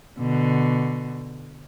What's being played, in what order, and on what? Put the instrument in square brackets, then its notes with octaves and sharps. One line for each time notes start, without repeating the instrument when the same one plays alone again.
[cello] B2 D3